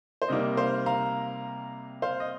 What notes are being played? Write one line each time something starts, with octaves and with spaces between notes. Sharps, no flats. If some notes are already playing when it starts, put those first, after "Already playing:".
C5
C3 G3 A#3 D#4 D#5
C5 F5
F5 A#5
C5 F5
D#5